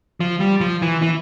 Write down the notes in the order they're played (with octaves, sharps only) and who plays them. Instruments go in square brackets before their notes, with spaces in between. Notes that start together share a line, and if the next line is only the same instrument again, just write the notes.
[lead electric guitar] F3
G3
F3
E3
E3